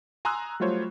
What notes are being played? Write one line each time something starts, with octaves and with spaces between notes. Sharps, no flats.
G#5 A#5 C6 D#6 E6 F#6
F#3 G3 A3 F4 C5 C#5